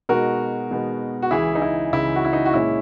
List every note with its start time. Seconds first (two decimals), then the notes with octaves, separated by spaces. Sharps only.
0.09 B2 G#3 B3 D#4 F#4 A#4
0.71 B2 G#3 B3 D#4
1.22 F#4
1.31 C#2 C#3 E3 E4 G#4
1.55 D#4
1.62 E4
1.93 C#2 C#3 E3 E4
2.16 F#4
2.25 E4
2.33 D#4
2.46 F#4
2.53 A#2 G#3 C#4 E4